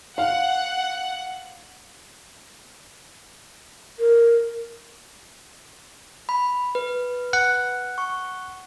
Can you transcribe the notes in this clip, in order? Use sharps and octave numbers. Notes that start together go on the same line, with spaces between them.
F5 F#5
A#4
B5
B4
F#5
C#6